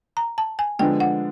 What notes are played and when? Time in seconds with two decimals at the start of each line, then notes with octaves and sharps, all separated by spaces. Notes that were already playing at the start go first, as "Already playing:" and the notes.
0.17 A#5
0.38 A5
0.59 G#5
0.79 D3 F3 G#3 B3 D4 G5
1.00 F#5